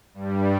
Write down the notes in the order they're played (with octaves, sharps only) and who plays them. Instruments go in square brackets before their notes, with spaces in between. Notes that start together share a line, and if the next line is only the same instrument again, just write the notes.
[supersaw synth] G2 G3